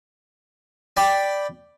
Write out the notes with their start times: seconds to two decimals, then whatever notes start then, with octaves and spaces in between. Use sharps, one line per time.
0.97 D5 G5 B5